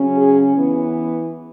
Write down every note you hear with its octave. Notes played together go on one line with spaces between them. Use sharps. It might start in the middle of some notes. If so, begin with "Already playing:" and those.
Already playing: C#3 F#3 C#4
G#4
E3 B3